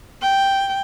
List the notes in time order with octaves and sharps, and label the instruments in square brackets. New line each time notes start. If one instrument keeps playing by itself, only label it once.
[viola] G5